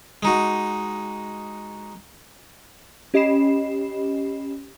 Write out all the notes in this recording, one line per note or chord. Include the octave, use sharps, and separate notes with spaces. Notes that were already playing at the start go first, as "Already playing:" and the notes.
G#3 D#4 F#4
C#4 G4 D#5 B5 C7 E7